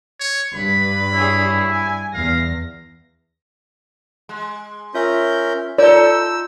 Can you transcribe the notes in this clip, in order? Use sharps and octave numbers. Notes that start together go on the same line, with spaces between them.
C#5
G2 B4 B5
E4 G#4 C#5
G#5
E2 F5 A#6
G#3
C#4 F4 A#4 E5 G6
D#4 F4 A4 D5 E6 G6